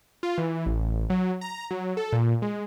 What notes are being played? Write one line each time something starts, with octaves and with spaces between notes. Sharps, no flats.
F4
E3
A1
F#3
A#5
F#3
A4
A#2
G#3